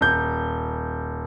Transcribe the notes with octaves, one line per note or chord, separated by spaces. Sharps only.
D#1 G6